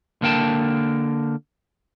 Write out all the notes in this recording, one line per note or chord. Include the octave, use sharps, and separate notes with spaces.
D3 A#3 A#4 G5 A5